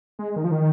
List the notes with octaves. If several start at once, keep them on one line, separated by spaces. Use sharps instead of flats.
G#3
D#3
F3
D#3